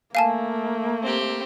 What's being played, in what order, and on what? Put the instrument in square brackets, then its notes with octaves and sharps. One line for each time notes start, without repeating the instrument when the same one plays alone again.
[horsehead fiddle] A3 A#3 [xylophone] F5 G#5 A5
[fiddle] C4 G4